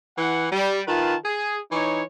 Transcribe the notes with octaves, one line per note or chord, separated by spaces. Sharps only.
E3 F#5
G3
D#3 F4 B4 A5
G#4
E3 D#4 C#5